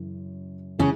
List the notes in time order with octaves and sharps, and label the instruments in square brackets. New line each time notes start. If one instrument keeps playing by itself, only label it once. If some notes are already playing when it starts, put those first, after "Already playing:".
Already playing: [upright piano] F#2 C#3 E3
[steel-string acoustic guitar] C#3 C#4 [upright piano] E3 G#3 E4